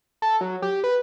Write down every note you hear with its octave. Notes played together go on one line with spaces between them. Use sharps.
A4
F#3
G4
B4